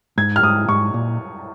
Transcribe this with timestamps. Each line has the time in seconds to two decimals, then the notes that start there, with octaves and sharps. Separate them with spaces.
0.18 G#2 G#6
0.36 F6
0.43 G#2 D#6
0.69 G#2 C#6
0.94 A#2